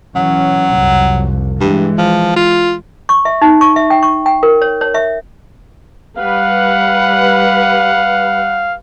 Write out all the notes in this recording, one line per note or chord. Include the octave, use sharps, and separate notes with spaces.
E3 F#3 C#4
C2 F2
G2 E3 G#3
F3
F4
C#6
E5
D#4
C#6
E5
G5
C#6
G5
A#4
C#5
C#5
E5
G3 B4 F5 F#5